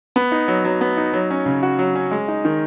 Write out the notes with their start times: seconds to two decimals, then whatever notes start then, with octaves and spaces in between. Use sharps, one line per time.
0.16 B3
0.32 D#4
0.48 F#3
0.65 F#3
0.81 B3
0.97 D#4
1.14 F#3
1.31 C#4
1.46 C#3
1.63 F#4
1.79 F#3
1.95 C#4
2.11 G#3
2.28 D#4
2.45 D#3